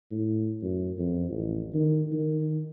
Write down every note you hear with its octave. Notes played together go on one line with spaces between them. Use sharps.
A2
F#2
F2
A1
D#3
D#3